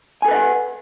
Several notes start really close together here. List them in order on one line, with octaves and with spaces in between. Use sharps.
G#5 A4 B4 D#5 F#5